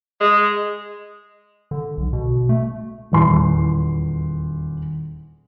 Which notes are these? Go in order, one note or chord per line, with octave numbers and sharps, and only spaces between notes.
G#3
D3
B1
B2
A3
D#1 E2 C6